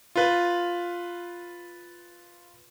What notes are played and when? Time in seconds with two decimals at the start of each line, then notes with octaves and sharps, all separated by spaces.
0.16 F4 B4